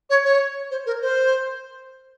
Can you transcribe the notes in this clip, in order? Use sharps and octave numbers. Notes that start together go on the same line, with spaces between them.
C#5
C#5
C5
A#4
C5